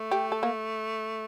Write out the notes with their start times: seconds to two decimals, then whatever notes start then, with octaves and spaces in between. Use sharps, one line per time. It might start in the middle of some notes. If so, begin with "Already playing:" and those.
Already playing: A3
0.11 G4
0.32 A4
0.43 A#3